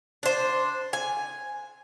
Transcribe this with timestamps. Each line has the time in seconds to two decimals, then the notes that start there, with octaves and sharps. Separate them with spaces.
0.23 D4 C5
0.93 G#5